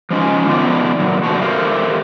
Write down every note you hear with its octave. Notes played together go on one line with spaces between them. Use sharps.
F3 G#3 C#4 D#4 F4
D3 D#3 F3 A3 B3 D4
A#2 F#3
G2 D3 E3 F#4 C5 A5
G4 A4 A#4 C5 E5 F5